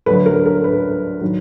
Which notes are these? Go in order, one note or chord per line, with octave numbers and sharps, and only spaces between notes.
D2 D3 F#3 B4
A#4
A#4
B4
D#3 F#3